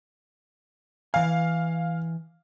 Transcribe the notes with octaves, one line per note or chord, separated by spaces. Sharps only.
E3 F5 G#5